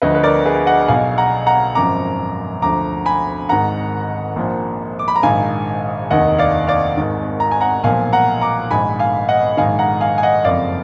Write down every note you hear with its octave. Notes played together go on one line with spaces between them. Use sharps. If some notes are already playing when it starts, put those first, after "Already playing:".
D2 D3 F3 B4 D#5
B4
A#4 D5
G#4 B4
D#5 F#5
B1 B2 F5 G#5
F#5 A#5
F#5 A#5
G#1 F#2 F3 A#5 D6
D2 D3 F3 A#5 D6
G#5 B5
G#1 G#2 D#3 F#5 A#5
A#1 A#2 F3
D6
B5
A#5
A#1 G#2 D#3 F5 G#5
F1 D#2 D#3 D#5 F#5
D5 F5
D5 F5
G#1 G#2 D#3
A#5
G#5
F#5 A#5
B1 A#2 F3 F5 G#5
F#5 A#5
A#5 D6
A#1 G#2 D#3 G#5 B5
F5 G#5
D#5 F#5
A#1 G#2 D#3 F5 G#5
F#5 A#5
F5 G#5
G#5
D#5 F#5
F#1 F2 F3 D5 F5